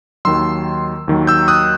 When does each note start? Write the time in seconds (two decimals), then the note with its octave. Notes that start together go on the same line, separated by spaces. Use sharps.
0.25 D#2 D#3 F#3 C6 E6
1.08 D#2 D#3 F#3
1.27 E6 G6
1.48 D#6 F#6